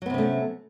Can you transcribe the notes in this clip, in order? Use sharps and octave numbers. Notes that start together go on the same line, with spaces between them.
C3 F#3 A3 B3 C#4